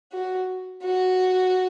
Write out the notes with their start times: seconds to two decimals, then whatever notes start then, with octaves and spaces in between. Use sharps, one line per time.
0.12 F#4
0.82 F#4